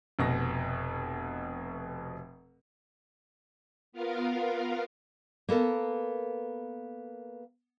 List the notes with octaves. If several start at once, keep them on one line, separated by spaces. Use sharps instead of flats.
F1 B2 A#6
B3 F4 A#4 F5
A#3 B3 A4 A#4